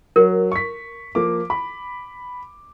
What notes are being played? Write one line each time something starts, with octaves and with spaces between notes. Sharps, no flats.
F#3 A#4
C#6 B6
F3 A#3 D6
B5